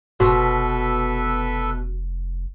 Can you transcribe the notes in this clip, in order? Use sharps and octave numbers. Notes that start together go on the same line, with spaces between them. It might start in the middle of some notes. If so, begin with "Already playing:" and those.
F1 B2 F#4 A4 B4 E5